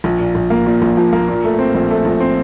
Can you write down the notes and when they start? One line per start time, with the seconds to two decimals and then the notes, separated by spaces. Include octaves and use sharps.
0.04 A#1
0.19 A#2
0.35 A#1
0.50 A#3
0.66 A#2
0.82 A#1
0.97 F3
1.13 A#3
1.28 A#2
1.44 A3
1.59 C4
1.75 A#1
1.90 A3
2.05 A#1
2.20 C4